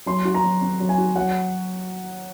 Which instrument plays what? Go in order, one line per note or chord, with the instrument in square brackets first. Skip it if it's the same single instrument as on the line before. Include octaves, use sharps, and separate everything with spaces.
[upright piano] F#3 [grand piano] C6
[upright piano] F#4
[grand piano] A#5
[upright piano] F#3
C4
F#3
[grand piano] G#5
[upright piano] F#4
[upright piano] F#3 [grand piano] F#5